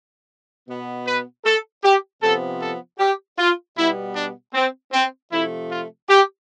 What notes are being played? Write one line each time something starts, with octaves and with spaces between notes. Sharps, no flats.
B2 B3
B4
A4
G4
C3 F3 B3 A4
A4
G4
F4
B2 G3 B3 E4
D4
C4
C4
C3 F3 A3 E4
F4
G4